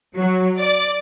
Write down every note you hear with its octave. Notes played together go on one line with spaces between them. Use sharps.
F#3
D5